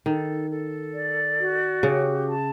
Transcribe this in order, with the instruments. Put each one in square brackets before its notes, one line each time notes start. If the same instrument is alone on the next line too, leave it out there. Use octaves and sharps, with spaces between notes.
[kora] D#3 [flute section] A4
[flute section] A4
D5
F#4
[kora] C#3 [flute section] G4
[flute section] A5